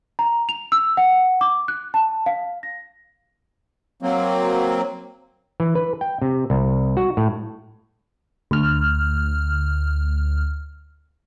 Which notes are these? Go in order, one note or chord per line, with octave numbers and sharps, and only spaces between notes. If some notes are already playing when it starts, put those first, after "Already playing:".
A#5
F7
E6
F#5
D6
F#6
A5
F5
A#6
F#3 A#3 C4
E3
B4
G5
C3
C2
F#4
A2
D2 F6